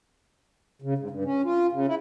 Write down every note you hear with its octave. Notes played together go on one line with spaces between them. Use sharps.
C#3
G#2
G2
C#4
F4
C#3
E4